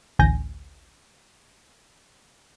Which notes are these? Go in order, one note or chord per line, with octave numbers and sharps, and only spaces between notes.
A1 D2 G#5 G6 A#6